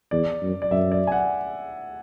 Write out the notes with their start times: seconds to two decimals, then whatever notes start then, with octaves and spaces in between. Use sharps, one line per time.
0.11 E2 D5
0.42 F#2
0.62 D5
0.71 F#2 E5
0.92 D5
1.07 G#5
1.12 F#5